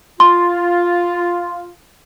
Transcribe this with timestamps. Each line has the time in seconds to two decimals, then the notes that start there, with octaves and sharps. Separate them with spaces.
0.20 F4 C6